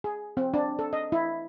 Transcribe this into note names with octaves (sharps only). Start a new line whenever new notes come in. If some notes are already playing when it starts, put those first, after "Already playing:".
G#4
C4
D4
A4
D#5
E4